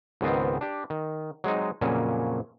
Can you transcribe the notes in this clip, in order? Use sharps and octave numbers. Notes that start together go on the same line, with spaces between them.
C#2 G#2 D#3 B3 C4
D4 G4
D#3
F#3 G#3 C4 D#4
F2 A#2 C#3 F#3 A#3 C#4